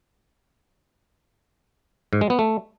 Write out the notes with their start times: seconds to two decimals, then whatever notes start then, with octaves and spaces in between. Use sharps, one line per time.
2.13 G#2
2.21 G#3
2.30 B3
2.39 A3